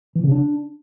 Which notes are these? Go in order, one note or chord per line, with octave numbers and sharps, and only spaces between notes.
E3
C#3
D4